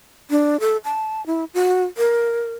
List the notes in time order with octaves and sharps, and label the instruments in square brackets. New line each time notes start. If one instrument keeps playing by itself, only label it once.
[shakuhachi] D4
A4
A5
E4
F#4
A#4